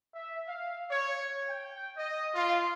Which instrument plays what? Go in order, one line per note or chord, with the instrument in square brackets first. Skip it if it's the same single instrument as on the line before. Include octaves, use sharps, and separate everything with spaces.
[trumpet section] E5
F5
C#5
G5
D#5
F4